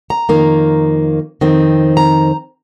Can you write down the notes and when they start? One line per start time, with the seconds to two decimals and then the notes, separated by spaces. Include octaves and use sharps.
0.10 A#5
0.29 F2 D#3 A#3
1.41 F2 D#3 C4
1.97 A#5